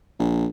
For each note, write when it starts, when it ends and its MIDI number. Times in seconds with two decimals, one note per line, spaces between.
0.19 0.46 34